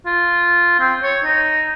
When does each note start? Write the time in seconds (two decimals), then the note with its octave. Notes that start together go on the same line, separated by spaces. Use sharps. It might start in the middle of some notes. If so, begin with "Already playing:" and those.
0.06 F4
0.80 C4
1.03 C#5
1.24 D#4